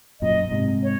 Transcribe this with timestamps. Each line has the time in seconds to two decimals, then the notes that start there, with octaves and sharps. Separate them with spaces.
0.21 F#2 A#2 D#5
0.51 G#2 C3
0.83 C#5